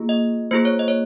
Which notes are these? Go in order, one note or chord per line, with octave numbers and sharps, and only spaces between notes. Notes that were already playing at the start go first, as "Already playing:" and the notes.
Already playing: A#3 F4 G#4
D#5
A#3 F4 G#4 C5
C#5
D#5
C#5